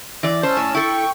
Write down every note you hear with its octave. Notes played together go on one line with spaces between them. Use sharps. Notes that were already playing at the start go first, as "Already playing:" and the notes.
E3 D5
C#4 C5 A5 E6
A2
E4 A4 G5 C#6